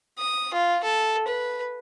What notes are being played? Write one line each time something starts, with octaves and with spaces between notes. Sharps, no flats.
D#6
F4
A4
B4